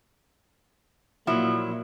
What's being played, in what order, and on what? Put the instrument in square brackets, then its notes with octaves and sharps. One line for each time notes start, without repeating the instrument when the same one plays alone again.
[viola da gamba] A#2 [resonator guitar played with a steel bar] F3 F#3 E4